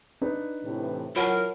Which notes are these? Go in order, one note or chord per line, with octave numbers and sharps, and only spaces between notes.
D4 D#4 B4
A2 C3 E3
E3 F#3 F4 A#4 C#5 F#5 A5